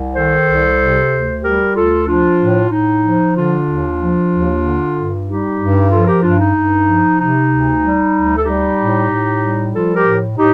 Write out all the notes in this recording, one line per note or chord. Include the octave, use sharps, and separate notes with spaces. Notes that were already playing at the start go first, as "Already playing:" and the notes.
Already playing: C2
D#3 A4 C5
C2
C3
D2
G3 G4 A#4
D2 F4 A4
F3 D4 F4
A2
A2 D#4
F3
D3 D4 F4
D#2
F3
D#2
D3
G2
G3 D#4 G4
G2
F3 F4 A4
G4 A#4
G2 D4 F4
D#4
G2
F3
C3 D#4
D2
G3
D2
A4
G3 D#4 G4
A2
A2
G3
F3 F4 A4
G4 A#4
A2
A2 D#4 G4